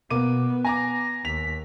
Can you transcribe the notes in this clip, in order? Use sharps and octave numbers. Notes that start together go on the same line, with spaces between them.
B2 A#3 B3 D6 D#7
G#5 A#5 D6 A#6
D#2 B6 F7